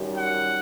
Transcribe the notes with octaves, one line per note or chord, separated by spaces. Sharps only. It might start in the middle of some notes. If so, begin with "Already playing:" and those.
Already playing: F#2 D#3 G3
F#5